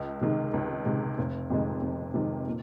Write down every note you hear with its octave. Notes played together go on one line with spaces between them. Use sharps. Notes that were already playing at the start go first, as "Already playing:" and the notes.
Already playing: C#2
C3 D#3 G#3
C#2
C3 D#3 G#3
F1
F2 C3 D#3 G#3
F1
F2 C3 D#3 G#3
A#2